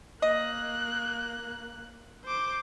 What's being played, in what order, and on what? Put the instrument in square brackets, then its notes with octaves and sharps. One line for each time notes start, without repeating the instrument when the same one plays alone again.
[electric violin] A#3 F#6 [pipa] D#5
[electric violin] C5 D6